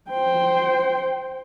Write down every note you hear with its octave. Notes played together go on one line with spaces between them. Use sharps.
C5 G5